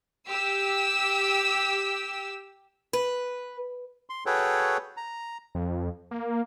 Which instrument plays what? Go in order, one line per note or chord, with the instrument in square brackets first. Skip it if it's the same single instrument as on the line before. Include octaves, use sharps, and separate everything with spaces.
[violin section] G4 E6
[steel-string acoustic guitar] B4
[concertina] C6
F#4 G#4 A4 B4 C#5 G5
A#5
[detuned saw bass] F2
A#3